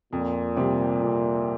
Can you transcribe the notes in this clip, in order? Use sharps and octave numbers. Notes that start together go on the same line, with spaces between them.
F2 A#2
C3 G3 C4 G4
F2